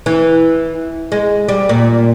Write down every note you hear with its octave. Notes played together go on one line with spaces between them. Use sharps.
E3
G#3
G3
A#2